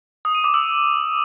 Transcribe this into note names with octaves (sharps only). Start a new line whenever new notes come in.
D#6
D#7
D6
E6